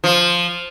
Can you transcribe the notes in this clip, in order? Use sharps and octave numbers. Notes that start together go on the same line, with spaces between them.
F3